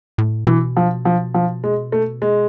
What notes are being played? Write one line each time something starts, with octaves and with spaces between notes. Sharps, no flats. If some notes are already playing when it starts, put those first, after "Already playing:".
A2
B2 E3
F3
F3
F3
G#3
A3
G#3